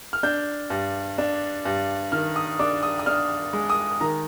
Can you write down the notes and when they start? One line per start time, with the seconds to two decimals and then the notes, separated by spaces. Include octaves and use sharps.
0.13 F6
0.23 D4 G6
0.70 G2
1.18 D4
1.65 G2
2.12 D#3 F6
2.36 D#6
2.59 D4 D6
2.83 D#6
2.99 D#6
3.06 D4 F6
3.53 G#3
3.70 D#6
4.01 D#3 A#5